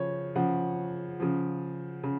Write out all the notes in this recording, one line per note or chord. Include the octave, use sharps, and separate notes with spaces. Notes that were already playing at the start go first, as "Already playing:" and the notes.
Already playing: C#3 F3 C#5
C#3 F3 F#5
C#3 F3
C#3